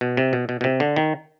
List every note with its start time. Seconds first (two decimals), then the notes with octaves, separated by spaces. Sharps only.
0.01 B2
0.17 C3
0.33 B2
0.49 B2
0.61 B2
0.64 C3
0.80 D3
0.96 D#3